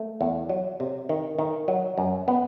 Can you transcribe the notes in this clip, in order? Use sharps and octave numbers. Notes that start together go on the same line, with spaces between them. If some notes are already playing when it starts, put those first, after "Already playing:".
Already playing: A3
E2
F#3
C3
D#3
D#3
F#3
F#2
B3